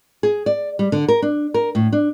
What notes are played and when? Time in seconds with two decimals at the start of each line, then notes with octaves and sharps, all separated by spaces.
0.23 G#4
0.46 D5
0.79 G3
0.92 D3
1.08 A#4
1.22 D4
1.54 A#4
1.75 A2
1.93 D4